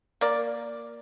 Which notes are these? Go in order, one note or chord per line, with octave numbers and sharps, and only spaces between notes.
A#3 D5